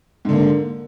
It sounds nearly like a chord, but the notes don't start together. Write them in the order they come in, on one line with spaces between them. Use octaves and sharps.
G#2 D3 A#3